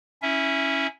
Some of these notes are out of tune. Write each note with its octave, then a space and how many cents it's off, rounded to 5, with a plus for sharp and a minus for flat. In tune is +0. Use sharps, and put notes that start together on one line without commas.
C#4 +0 E4 -20 E5 +0